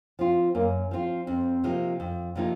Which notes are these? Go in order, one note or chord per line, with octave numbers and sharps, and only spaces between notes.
F3 C4 F4
F#2 A#3
F3 C4 F4
F2 C4
C3 F3 A#3 D#4
F2
C3 F3 A#3 D#4